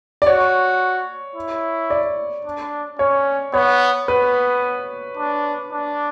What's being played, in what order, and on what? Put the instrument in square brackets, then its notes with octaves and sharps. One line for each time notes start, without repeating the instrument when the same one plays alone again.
[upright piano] D5
[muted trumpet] F#4 [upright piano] C#5
[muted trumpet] E4
[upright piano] D5
[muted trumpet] D4
[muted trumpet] C#4 [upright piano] C#5
[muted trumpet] B3 [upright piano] C#5
[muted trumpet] B3 [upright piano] B4
[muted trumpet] D4
D4